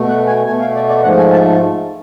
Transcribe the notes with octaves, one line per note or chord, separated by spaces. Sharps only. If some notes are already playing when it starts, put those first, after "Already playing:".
Already playing: B2 A3
F#5
G#5
B2 A3 G#5
F5
D5
D5
G#2 F3 A3 F#5
G#5
A5